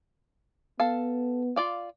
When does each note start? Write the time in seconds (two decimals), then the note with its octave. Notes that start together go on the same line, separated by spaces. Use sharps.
0.80 B3 A4 F5
1.56 F4 D5 F5